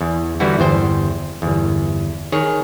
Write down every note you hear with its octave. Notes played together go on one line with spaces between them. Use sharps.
E2
D3 E3 G3 E4 F#4
G1 E2 C5 G5
G1 E2
D#3 G#4 C#5